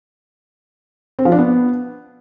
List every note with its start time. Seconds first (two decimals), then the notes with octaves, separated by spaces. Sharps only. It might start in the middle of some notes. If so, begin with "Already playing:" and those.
1.19 C4
1.25 F3
1.32 D4
1.39 B3